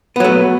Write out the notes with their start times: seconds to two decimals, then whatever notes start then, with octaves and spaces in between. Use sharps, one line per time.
0.16 B3
0.20 F#3
0.24 A3